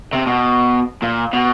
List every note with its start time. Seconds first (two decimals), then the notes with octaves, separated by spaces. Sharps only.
0.13 C3
0.27 B2
1.02 A#2
1.33 B2